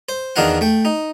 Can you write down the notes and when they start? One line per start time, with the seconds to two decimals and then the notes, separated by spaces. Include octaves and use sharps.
0.09 C5
0.36 E2 D#3 D4 D#4 F5 F#5
0.61 A3 G5
0.85 D#4